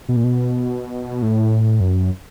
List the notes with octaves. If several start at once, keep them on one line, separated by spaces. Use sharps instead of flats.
B2
A#2
B2
A2
F#2